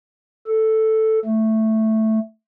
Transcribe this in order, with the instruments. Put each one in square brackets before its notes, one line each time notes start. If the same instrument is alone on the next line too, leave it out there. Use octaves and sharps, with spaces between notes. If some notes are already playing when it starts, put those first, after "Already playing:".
[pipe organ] A4
A3